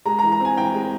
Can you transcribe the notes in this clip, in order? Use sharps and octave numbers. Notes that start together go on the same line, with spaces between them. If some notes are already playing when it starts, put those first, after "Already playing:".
G#3 A#5
A#5
E3
A#5
C4 G#5
E3 G5
G#3